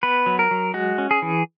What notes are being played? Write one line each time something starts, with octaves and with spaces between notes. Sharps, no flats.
B3 B4
F#3
A#4
F#3
G#3 F#4
C#4
G#4
E3